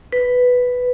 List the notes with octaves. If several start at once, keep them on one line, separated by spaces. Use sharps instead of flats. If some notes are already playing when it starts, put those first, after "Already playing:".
B4